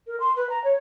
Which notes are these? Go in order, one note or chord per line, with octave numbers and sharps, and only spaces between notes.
A#4
C6
B4
A#5
C#5